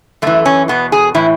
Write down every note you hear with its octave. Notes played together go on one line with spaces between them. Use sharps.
F#2 E3 A3
C#4
E2 B2 B3
G#4
A2 E3 E4